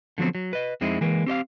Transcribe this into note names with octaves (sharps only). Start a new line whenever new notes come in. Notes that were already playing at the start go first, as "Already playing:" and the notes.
D3 F3 F#3 B3 C4
F#3
B4 D#5
F2 G#3 C4 D#4 E4
E3 G#3 A#3 B4
C4 G4 D#5 F5